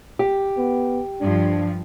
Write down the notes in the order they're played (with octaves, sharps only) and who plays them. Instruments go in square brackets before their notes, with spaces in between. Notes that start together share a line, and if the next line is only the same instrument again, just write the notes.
[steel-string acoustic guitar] G4
[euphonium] B3
[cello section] G2 F3 [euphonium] D4